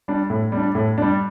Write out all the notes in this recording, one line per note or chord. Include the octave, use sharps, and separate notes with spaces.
G3 D4
A2
G3
D4
A2
G3 D4